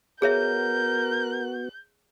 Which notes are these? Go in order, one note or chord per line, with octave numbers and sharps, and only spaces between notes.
B3 F#4 G#4 A#4 C#5 E5 G6